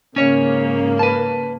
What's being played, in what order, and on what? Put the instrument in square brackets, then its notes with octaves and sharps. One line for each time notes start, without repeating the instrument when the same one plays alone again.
[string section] G#2 C#3 A#3 [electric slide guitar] C#4 C#5
[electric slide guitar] B4 A5